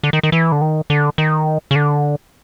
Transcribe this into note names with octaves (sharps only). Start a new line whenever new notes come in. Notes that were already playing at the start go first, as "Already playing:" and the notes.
D3
D#3
D#3
E3
D3
D#3
D3
D#3
C#3
D3